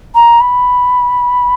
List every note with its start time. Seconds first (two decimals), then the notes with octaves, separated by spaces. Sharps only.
0.15 A#5
0.40 B5